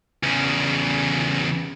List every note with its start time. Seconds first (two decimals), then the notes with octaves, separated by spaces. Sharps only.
0.23 E2 C#3